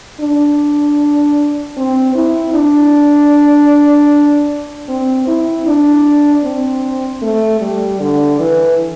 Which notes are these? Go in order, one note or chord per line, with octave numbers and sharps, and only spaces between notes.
D4
C4
E4
D4
C4
E4
D4
C4
A3
G3
D3
E3